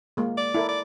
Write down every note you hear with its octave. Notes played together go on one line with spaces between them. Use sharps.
G#3 A#3
D5
E4 A4 A#4
D5